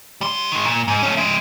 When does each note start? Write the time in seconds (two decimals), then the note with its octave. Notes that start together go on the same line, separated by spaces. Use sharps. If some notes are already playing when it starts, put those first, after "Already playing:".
0.21 G3 C6
0.52 D#3 G#3
0.65 A#2
0.88 G#2
1.03 A3 C#4
1.17 G#3 E5